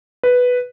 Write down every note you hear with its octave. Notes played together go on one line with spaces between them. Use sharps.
B4